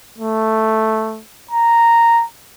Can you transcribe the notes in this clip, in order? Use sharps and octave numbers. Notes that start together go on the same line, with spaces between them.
A3
A#5